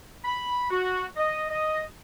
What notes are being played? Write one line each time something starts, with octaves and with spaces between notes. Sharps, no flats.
B5
F#4
D#5
D#5